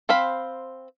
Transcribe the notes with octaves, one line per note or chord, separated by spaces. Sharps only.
C4 C5 F5 B5